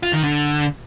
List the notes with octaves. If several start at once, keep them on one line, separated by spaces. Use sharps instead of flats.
F4
D#3
D3